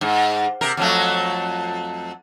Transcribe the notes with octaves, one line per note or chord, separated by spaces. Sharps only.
G#2
C3 A#4
F2 F#3 A3